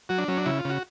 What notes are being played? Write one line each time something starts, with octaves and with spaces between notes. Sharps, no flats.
F#3 F#4
D4
F#3 C#4
D4
C#3 E4
F4
C#3
F#4